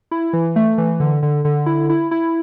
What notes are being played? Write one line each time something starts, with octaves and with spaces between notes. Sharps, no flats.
E4
E3
A3
E3
D3
D3
D3
E4
E4
E4